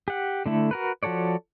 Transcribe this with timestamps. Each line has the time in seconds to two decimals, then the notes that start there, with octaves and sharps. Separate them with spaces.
0.08 G4 F#5
0.46 D3 A3 E4
0.71 F#4 A#4 B4
1.03 F3 F#4 A4 C#5 D5